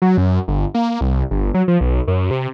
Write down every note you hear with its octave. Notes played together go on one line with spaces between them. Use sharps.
F#3
F#2
G1
A#3
C2
G1
F#3
F3
B1
F#2
C3